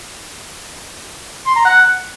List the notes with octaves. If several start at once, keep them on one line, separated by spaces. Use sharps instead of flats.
C6
A#5
F#5